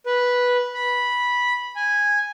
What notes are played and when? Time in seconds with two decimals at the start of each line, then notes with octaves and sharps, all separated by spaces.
0.06 B4
0.74 B5
1.76 G#5